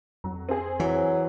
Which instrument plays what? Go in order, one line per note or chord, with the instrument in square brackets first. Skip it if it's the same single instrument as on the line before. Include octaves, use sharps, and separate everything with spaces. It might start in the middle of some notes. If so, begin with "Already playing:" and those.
[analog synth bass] F2 [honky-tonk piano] F#3
[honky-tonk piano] C4 G#4
[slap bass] E3 [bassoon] F#3